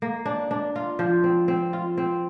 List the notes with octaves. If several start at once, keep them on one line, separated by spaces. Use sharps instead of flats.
A#3
D4
D4
F4
F3
C4
C4
F4
C4